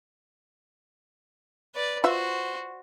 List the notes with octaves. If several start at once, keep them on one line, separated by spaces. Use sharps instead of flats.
B4 D5
F4 F#4 B4 C5 E5